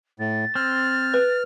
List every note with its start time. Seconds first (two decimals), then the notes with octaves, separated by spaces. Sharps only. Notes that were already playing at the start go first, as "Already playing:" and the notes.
0.20 A2 A6
0.55 C4 F6
1.14 B4